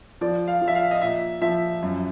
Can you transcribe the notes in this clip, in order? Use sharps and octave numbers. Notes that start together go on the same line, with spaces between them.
F3 D5
F5
F3
E5
F5
D#5
A#2 E5
F3 E5
F#2